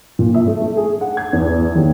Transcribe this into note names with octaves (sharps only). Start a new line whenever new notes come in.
A#2
E5
A3
A3
G#4
F#5
G#6
E2
D#2